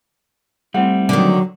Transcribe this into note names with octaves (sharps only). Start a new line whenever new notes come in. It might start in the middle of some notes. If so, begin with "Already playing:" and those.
G3 A3 C4 E4 F#5
D3 D#3 F#3